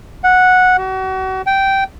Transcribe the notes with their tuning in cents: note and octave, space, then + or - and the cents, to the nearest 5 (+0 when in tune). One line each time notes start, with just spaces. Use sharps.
F#5 -10
F#4 +35
G5 -10